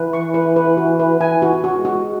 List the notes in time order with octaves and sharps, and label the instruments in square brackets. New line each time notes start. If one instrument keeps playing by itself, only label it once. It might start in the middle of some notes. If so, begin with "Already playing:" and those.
Already playing: [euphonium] E3 [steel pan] B4
[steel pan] C#6
B4
B4
F#4
B4
[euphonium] E3 [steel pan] G#5
[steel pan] F#4
F#4
[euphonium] G#3
[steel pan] F#4